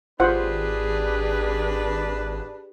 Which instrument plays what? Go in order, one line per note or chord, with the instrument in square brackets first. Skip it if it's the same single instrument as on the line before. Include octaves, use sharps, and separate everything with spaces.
[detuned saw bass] G#1 [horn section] D4 B4 [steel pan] F4 C5 F#5 [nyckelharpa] G4 G#4